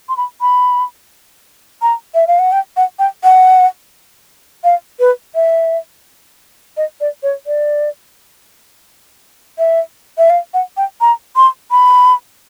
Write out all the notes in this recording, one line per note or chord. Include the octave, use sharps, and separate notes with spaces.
C6
B5
B5
A#5
E5
F5
F#5
G5
F#5
G5
F#5
F5
B4
E5
D#5
D5
C#5
D5
E5
E5
F5
F#5
G5
A#5
C6
B5